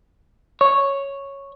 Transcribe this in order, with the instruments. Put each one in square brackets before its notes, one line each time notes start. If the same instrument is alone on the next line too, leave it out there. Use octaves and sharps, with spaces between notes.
[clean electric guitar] C#5